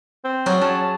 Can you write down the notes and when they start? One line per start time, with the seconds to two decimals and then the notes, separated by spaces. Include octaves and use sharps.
0.25 C4
0.46 F#3 G3 F#4 G#4 C#5
0.61 F#3 C#4 A5